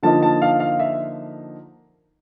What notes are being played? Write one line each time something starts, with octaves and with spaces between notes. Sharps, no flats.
D3 F3 A#3 D#4 A5
A5
F5
F5
E5